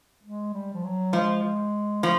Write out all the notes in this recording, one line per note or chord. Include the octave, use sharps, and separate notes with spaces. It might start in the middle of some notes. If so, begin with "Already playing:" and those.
G#3
G3
F3
F#3
F3 G#3
F3 A3